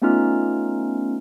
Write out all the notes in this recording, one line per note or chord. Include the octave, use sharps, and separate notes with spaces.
A3 B3 C#4 D#4 F4 F6